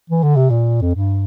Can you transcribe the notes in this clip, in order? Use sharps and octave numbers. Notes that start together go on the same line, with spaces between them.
E3
D3
C3
A#2
F2
G2